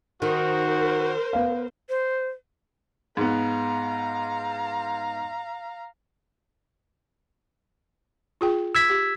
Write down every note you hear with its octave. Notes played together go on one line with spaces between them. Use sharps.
D#3 F#4 A#4 C5
B3 F5
C5
G#2 B3 F5 A#5
F4 G#4 G5
E6 G#6 B6
G4